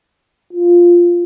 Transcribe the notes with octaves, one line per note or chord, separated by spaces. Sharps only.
F4